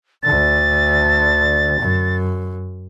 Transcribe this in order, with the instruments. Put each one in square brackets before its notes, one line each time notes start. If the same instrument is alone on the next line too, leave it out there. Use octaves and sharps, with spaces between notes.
[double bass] D2 D3 [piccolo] A6
[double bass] F#2